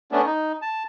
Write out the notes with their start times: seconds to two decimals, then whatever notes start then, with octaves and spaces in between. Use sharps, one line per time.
0.12 A3 B3 C#4 D4
0.26 D#4
0.62 A5